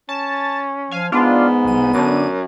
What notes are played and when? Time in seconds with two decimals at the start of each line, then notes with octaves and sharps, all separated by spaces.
0.09 C#4 A5
0.91 F3 F5 G#5
1.12 G#2 B3 D4 F4
1.64 C2 D#7
1.93 F#2 D3 D4 D#7